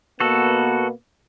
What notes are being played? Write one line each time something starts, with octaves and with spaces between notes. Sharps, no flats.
B2 A#3 B3 F#4 A4